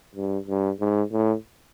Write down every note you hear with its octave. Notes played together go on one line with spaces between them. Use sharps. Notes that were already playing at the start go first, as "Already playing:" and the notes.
G2
G2
G#2
A2